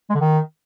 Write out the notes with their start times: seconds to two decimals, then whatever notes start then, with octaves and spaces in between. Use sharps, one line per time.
0.10 G#3
0.15 D3
0.20 D#3